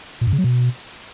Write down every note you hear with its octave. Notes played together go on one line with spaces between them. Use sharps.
A#2
G2
C#3
F#3
B2